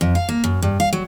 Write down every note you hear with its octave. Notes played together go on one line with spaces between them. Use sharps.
F2
F5
A#3
F#2
G2
F5
F#3